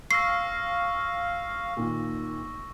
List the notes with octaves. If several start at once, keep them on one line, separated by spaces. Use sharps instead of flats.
F5 C#6 E6 A#6 C7
A#2 D#3